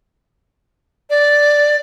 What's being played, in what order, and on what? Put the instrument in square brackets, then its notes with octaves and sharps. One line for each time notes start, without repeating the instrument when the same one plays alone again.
[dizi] D5